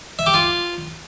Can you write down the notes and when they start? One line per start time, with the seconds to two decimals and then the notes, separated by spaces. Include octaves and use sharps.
0.19 E5
0.26 G4
0.34 F4